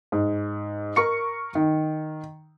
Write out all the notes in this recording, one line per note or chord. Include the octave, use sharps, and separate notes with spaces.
G#2
A#4 C#6 C#7
D#3